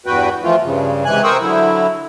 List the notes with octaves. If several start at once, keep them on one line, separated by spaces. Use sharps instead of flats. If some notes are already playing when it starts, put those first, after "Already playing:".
E2 G2 F#4 B4 G5
E3 F3 A3 F4
G2 C#3
G#2 C3 E3 G#5 F#6
A#4 C5 G5 C#6 D#6 E6
D3 F#3 E4